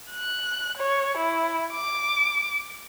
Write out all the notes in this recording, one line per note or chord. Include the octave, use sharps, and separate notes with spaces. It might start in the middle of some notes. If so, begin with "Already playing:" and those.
F#6
C#5
E4
D6